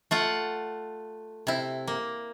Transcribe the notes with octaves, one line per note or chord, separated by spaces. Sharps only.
A3 F4 F#5
C3 E4
A#3